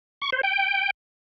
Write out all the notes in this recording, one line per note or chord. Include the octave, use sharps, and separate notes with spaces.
C#6
C5
G5